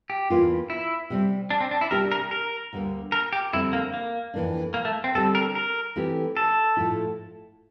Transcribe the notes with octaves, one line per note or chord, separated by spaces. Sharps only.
G4
E2 E3 A#3 D4 F4
E4
C3 G3 C4
D4
C4
D4
E4
C3 G3 D4 G4 A#4
A#4
A#4
D2 D3 G3 A#3
A#4
G4
F2 D3 G3 C4 E4
A#3
A#3
F2 E3 A#3 D4
A#3
A3
C4
D3 G3 C4 G4 A4
A#4
A#4
E3 A3 C4 G4
A4
A2 F3 A3 E4